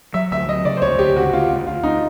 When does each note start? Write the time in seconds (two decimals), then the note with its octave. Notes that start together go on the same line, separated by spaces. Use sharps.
0.14 F#3 E5
0.31 D2 E5
0.48 F#3 D#5
0.65 C#3 D5
0.77 C5
0.82 D2 C#5
0.99 D2 G4
1.16 C#3 F#4
1.33 D2 F4
1.50 D2
1.67 D2 F4
1.83 D2 D#4